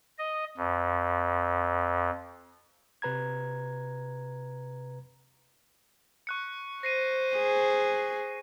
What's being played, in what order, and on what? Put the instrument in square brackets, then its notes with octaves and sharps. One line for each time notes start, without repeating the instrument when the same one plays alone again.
[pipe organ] D#5
F2
[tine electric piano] C3 B4 A#5 G#6
[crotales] C#6 F#6 C#7
[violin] C5 [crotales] A#6 C7 D#7
[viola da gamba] G#4